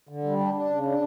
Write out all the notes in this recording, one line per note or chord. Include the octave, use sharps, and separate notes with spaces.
D3
G3
D4
D4
C#3
D4